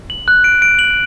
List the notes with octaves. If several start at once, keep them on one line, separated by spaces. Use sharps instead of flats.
F#7
F#6
D7
D7
F#7